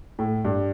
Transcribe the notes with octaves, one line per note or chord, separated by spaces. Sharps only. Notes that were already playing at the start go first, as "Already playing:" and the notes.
A2
G2